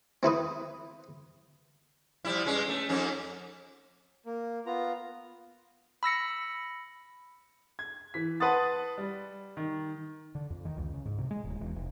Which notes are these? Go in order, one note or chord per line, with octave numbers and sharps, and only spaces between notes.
C4 E4 B4 D#6
F3 G3 E4
G2 G#3 C#4
A3
F2 C#4 D#4
A#3
B3 F4 A#5
B5 E6 A#6 C#7
G#6
E3 B6
B4 F#5 A5 C6 D#6 A6
G3
D#3
D3
F2
D#3
C#2
C#3
G#2
C3
G#3
D#1
E1
F1